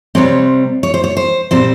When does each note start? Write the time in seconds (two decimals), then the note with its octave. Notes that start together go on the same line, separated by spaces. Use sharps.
0.15 C3 G3 C4 C#5
0.83 C#5
0.94 C5
1.04 C#5
1.17 C5
1.51 A#2 G3 C4 C5